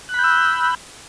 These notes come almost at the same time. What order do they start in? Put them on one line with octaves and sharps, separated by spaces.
F#6 B5 G6 E6